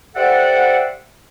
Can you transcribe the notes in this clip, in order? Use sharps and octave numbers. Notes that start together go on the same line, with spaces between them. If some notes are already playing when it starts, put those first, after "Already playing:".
G4 A4 C5 D5 E5 F#5